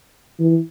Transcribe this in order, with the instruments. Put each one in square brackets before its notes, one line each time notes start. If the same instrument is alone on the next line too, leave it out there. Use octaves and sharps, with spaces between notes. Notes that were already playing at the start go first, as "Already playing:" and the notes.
[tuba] E3